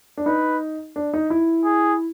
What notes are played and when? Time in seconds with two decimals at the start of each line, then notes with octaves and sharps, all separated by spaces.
0.17 D4
0.26 D#4 B4
0.96 D4
1.14 D#4
1.30 E4
1.65 G#4